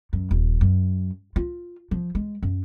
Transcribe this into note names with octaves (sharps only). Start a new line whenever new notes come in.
F#2
D#1
F#2
F4
F3
G#3
F#2